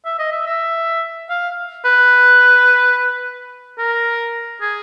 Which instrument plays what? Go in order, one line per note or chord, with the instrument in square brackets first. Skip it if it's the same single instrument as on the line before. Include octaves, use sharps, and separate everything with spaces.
[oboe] E5
D#5
E5
E5
F5
B4
A#4
G#4